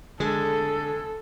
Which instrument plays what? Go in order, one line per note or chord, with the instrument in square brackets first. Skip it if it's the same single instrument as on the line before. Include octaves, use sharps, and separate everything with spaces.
[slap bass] D3 [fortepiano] G#3 [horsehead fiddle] A4